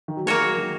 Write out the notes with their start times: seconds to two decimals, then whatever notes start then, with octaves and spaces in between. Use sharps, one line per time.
0.08 D#3
0.17 F#3
0.26 G#3 A#3 F#4 C#5
0.42 F#3
0.57 D#3